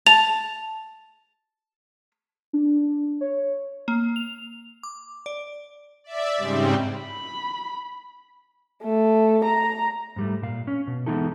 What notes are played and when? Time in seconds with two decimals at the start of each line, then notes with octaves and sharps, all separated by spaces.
0.07 A5 F7
2.53 D4
3.21 C#5
3.88 A#3
4.16 F7
4.83 D6
5.26 D5
6.04 D5 E5
6.37 G#2 C#3 G3 C4
6.97 B5
8.84 A3
9.45 A#5
10.16 G#2 G3 A3
10.42 A#2 F5
10.67 C#4
10.87 B2
11.06 E3 G#3 B3 D#4 E4 A4